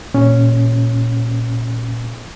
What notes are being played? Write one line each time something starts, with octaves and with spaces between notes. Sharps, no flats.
A#2 C#4